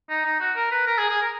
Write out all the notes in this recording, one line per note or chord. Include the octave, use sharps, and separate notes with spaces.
D#4
D#4
F#4
A#4
B4
A#4
G#4
G#4
A#4